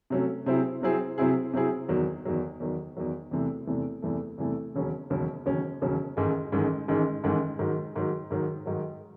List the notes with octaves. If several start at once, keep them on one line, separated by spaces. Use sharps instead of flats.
C3 F#3 A3 C#4
C3 F#3 C4 E4 G#4
C3 F#3 C4 E4 G#4
C3 F#3 C4 E4 G#4
C3 F#3 C4 E4 G#4
E2 D#3 F#3
E2 D#3 F#3
E2 D#3 F#3
E2 D#3 F#3
E2 C3 E3 A3
E2 C3 E3 A3
E2 C3 E3 A3
E2 C3 E3 A3
E1 D#2 C#3 F#3 C#4
E1 D#2 C#3 F#3 C#4
E1 D#2 C#3 F#3 C#4
E1 D#2 C#3 F#3 C#4
A1 G#2 D#3 G#3
A1 G#2 D#3 G#3
A1 G#2 D#3 G#3
A1 G#2 D#3 G#3
G#2 D#3 F#3
G#2 D#3 F#3
G#2 D#3 F#3
G#2 D#3 F#3